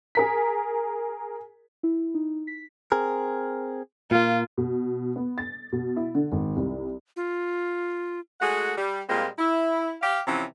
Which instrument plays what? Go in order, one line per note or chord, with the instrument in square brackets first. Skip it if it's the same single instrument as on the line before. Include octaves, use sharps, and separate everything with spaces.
[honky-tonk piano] G#4 A#4 B6
[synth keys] E4
D#4
B6
[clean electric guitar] C4 G#4 A#4
[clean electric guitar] A#2 A#3 [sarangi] F4
[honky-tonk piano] B2
B3
A6
B2
E4
D3
G#1
C2
[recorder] F4
[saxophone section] G#3 A3 F#4 G#4 F#5
G3
A#2 G3 G#3 A#3 C4 F4
E4
G4 F5
C3 E3 F3 C#4